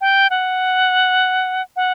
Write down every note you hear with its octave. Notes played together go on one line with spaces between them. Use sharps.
G5
F#5
F#5